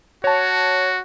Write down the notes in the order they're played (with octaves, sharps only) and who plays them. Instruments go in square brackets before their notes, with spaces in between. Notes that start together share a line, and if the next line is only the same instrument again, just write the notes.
[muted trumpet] F#4 [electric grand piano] C#5 A5